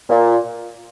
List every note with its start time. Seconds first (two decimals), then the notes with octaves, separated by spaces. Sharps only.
0.09 A#2